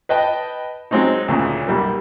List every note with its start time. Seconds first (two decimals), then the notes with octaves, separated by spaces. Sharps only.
0.09 B4 D#5 G5 A5 B5
0.91 F#3 G#3 C4 C#4 D#4
1.28 D2 A#2 C#3
1.68 B1 G3 A#3